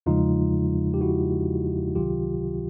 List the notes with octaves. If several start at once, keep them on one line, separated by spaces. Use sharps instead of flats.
E2 C#3 F3 G#3 D#4 F4
G4
E4 F#4
C#2 C3 D#3 F#3 F4 G4